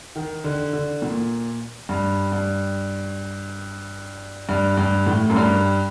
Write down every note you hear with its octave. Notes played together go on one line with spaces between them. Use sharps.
D#3
D3
D3
A#2
G2
G2
G2
G2
A2
F#2
G2